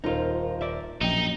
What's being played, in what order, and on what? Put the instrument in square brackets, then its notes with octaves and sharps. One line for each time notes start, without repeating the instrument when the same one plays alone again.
[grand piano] D#1 A#4 C5 [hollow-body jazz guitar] D#4 F4
[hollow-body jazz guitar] D5 E5
[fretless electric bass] A#1 F#2 [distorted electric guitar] D#4 [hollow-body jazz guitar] D#5 [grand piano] G5 G7